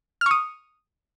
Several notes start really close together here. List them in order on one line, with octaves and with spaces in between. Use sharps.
F6 C#6 D#6